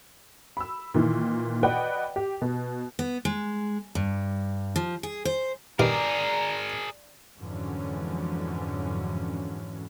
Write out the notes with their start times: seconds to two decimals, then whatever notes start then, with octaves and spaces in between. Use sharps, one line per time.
0.57 B5 E6
0.94 A#2 D#3 E3
1.63 B4 D5 D#5 F#5 G5
2.16 G4
2.42 B2
2.99 B3
3.25 G#3
3.95 G2
4.76 F3
5.03 G#4
5.25 C5
5.79 G2 D#3 G#4 A#4 D5 A#5 D6
7.37 F2 G#2 D3 E3 F#3 C#4